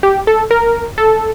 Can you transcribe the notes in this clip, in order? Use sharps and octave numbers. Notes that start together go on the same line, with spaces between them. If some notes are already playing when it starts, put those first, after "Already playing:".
G4
A4
A#4
A4